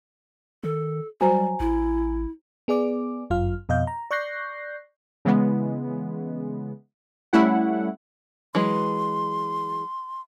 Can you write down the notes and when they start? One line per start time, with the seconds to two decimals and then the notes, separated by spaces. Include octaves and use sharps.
0.64 D#3 A4
1.21 F#3 G3 F#4 C5 G#5 A#5
1.60 A1 E4
2.68 B3 G#4 D5 D6
3.30 G1 F#2 F4 F5 F6
3.69 F2 B2 D#5 F5 G6
3.87 A#5
4.11 D5 C#6 F#6 G6 A#6 C7
5.25 C#3 E3 G#3 B3
7.33 G3 A3 C#4 E4 F#5
8.55 E3 F#3 G#3 C6